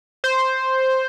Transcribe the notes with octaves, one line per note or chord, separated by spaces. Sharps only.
C5